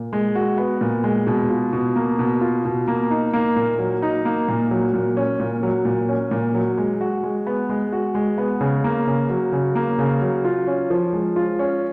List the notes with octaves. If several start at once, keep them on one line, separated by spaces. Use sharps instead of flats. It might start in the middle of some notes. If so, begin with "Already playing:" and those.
Already playing: A#2
G#3
F#4
B3
A#2
G#3
B2
F4
B2
A#3
B2
F4
B2
A#3
D#4
A#3
A#2
F#3
D#4
A#3
A#2
F#3
A#2
C#4
A#2
F#3
A#2
C#4
A#2
F#3
G#3
F#4
G#3
B3
G#3
F#4
G#3
B3
C#3
A#3
C#3
F#3
C#3
A#3
C#3
F#3
F4
C#4
F3
G#3
F4
C#4